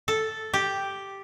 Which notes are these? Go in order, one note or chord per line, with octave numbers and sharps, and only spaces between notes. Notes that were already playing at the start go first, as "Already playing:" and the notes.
A4
G4